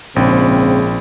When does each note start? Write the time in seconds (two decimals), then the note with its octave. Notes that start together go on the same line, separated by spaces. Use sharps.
0.16 A#1 G#2 C#3 C4